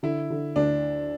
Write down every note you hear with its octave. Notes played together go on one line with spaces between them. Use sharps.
D3 E4
D3
D2 D4